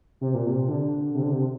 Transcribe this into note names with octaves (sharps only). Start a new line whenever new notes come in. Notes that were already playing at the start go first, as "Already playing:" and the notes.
C3
A#2
C3
D3
C3
D3
C3